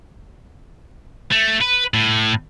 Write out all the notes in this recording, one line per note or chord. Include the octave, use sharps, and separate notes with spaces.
A3
B4
A2